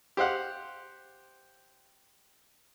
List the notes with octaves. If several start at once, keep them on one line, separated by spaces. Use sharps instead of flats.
G4 C5 F5 F#5